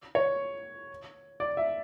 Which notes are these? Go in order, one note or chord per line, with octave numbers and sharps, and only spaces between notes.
C#5
D5
E5